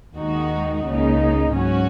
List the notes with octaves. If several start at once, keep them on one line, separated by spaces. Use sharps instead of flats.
D#2 D#3 G#3 D#4 F#4
C#2 C#3 A#3 D#4
G#2 F#3 C#4 F#4